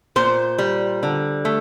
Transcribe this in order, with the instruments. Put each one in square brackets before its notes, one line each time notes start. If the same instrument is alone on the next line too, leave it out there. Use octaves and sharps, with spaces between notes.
[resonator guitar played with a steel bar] A#2 C5
G3
D3
A3